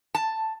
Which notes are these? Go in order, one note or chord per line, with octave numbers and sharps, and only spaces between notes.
A5